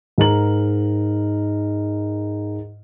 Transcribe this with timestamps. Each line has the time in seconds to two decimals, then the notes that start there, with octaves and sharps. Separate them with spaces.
0.18 G#2 A#4 F#7